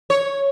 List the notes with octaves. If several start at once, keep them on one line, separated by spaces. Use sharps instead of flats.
C#5